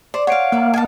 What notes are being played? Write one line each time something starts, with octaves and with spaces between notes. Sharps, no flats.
C5 D5
C5 C#5 F5 F#5 C7 D7
A#3 B3 E4 B4
B3 D#4 G#5 A5